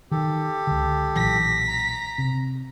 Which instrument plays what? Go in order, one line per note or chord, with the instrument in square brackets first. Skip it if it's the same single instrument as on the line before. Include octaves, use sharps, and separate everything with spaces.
[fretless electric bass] D#3 [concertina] G4 A4
[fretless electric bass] C#2 D3
[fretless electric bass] B1 A#2 E3 [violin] A#6 B6
[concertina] A#5
[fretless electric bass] C3